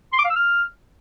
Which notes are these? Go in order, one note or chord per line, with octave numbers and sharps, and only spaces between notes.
C6
D6
F5
E6
F6